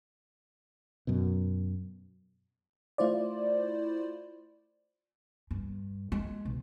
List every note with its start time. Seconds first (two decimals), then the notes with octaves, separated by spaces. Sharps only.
1.07 F#2 B2
2.98 A3 E4 F4 C5 D5
5.51 G2
6.12 G#3
6.45 B1